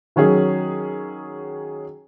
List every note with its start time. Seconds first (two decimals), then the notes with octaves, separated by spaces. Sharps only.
0.16 D#3 F#3 C#4 G#4